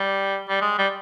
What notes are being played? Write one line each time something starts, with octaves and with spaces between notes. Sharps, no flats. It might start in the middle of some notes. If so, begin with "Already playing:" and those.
Already playing: G3
G3
G#3
G3